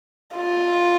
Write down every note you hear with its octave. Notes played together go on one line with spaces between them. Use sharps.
F4